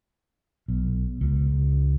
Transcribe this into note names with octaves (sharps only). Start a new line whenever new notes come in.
B1
C#2